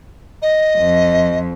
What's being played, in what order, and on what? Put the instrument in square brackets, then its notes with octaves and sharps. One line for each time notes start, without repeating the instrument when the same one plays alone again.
[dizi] D#5
[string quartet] F2